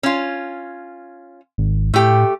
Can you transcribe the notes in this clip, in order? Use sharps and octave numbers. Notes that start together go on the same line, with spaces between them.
C#4 F4
G#1
A2 A3 G4